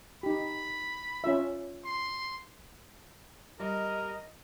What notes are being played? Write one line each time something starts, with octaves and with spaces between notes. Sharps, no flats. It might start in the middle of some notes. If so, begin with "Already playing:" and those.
D#4 G4 B5
C#4 F4 E5
C6
G3 A#4 D#5